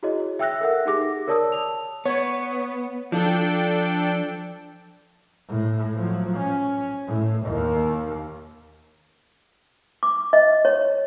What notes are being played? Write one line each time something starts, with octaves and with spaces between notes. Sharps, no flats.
E4 F#4 G#4 C#5 D#5
E5 G5 E6 F#6 A#6
A4 A#4 E5 F#5
D#4 G4 G#4 D6 A#6
A#4 C#5 D5 A5 D#6 E6
A5 F7
B3 C#5
F3 D4 A4 G5
A2
F3 F#3
C#4
A2
D#2
D6
D#5
C#5